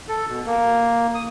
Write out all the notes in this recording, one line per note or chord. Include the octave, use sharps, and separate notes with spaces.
A4
B2
A#3
D#6